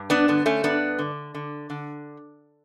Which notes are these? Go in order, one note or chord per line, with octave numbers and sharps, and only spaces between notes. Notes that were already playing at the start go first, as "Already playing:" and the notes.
Already playing: G2
B3 D4
D3 B3
A3 C#4
G2 B3 D4
D3
D3
D3